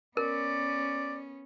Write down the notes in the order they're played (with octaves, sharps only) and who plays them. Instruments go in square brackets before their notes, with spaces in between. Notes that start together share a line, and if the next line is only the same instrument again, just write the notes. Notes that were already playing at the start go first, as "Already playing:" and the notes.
[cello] B3 C#4 [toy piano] A#4 [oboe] D5